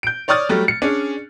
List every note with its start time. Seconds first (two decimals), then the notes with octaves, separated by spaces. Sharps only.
0.03 G6 D7
0.28 C#5 D5 C#6 D#6 F6 A6
0.49 F#3 G3 A3
0.68 C#7
0.82 C#4 D4 G#4